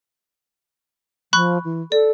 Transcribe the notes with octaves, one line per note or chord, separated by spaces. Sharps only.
F3 B5 C#6 F#6
E3
A4 D5